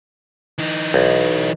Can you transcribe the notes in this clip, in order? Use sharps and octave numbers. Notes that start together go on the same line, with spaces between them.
E3 D#4
B1